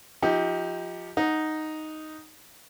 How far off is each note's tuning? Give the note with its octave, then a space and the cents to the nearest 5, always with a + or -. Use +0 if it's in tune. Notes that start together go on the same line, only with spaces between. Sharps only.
F3 +10 D#4 +30 G4 +0
D#4 +0 F#5 -10